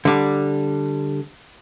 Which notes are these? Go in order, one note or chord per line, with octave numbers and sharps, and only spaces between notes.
D3 G3